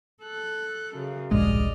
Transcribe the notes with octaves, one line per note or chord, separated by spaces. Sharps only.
A4 F#6
F#2 C#3
D1 A#1 G2 G#3 D5 D#5 F6